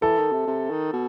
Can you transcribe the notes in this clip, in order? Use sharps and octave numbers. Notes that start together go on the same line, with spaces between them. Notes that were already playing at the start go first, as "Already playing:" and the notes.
E3 A4
D#3
C3
C3
D#3
B2